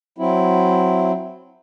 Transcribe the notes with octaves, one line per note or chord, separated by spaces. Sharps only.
F#3 C4 E4